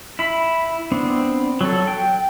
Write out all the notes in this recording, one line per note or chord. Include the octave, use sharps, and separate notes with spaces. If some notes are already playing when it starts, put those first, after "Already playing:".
E4 B5
B3 C4 D4
F#3 A4
G5